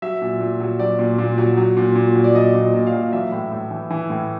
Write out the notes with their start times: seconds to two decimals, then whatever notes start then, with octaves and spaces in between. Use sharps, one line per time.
0.02 F#3 E5
0.22 A#2
0.40 A#2
0.60 F#3
0.79 F#3 D5
0.99 A#2
1.18 A#2
1.38 F#3
1.57 F#3
1.77 A#2
1.95 A#2
2.16 F#3
2.24 D5
2.35 F#3 D#5
2.55 A#2
2.61 D#5
2.74 A#2
2.87 F5
2.93 F#3
3.13 E3 E5
3.32 A2
3.52 A2
3.71 E3
3.90 E3
4.10 A2